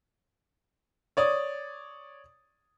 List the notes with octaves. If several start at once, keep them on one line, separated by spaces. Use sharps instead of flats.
C#5 D5 D#6